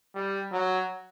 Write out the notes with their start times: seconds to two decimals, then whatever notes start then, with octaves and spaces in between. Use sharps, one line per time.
0.15 G3
0.52 F#3